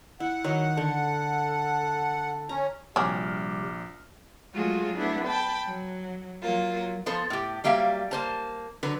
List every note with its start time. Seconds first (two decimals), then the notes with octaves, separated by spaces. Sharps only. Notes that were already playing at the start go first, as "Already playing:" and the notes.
0.20 E4 F#5
0.44 D#3 F#3 D#4
0.77 D3 A4
2.49 C#4 A#5
2.96 A#1 C3 F#3 G3 C4 G#4 D6 F6
4.54 F#3 G#3 A3 F4 F#4 G#4
4.97 A3 B3 D4 E4
5.26 G5 A5 B5
5.65 F#3
6.41 F#3 A#3 F4
7.06 F3 B3 A4 C5
7.30 A2 G4
7.64 F#3 G3 A#3 E5 F5
8.11 A#3 C5 A5
8.83 D3 F#3 B4